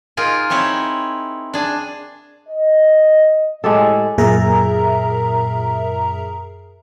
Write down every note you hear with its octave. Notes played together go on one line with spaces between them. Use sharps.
D#4 F4 G#4 A#4
C4 D#4 E4 C#5
D4 G#4
D#5
A2 G#3 G4 A4
F#2 A#2 G#4 A#4 E5 A#5